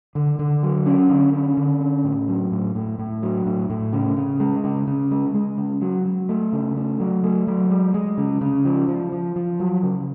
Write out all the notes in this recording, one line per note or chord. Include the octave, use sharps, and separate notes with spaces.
D3
D3
F#3
C#4
D3
C#4
D3
C#4
A2
F#3
A2
A2
A2
F#3
A2
A2
C#3
C#3
G#3
C#3
C#3
G#3
G#3
C#3
F#3
F#3
A3
C#3
A3
F#3
A3
F#3
G#3
G#3
C#3
C#3
F3
F3
F3
F3
F#3
C#3